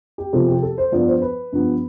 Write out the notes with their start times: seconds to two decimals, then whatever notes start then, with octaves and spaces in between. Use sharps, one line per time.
0.18 G4
0.33 C3 F3 C4 A4
0.48 G4
0.63 A4
0.78 C5
0.92 G2 F3 B3 D4 F4 D5
1.07 C5
1.22 B4
1.52 G2 F3 B3